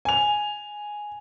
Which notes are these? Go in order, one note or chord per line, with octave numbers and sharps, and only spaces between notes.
G#5 F7